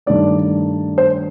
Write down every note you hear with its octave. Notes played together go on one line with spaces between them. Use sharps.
G2 D#3 A3 D4 D5
C5